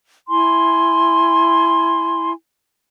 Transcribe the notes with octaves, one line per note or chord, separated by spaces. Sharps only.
E4 G#5 C6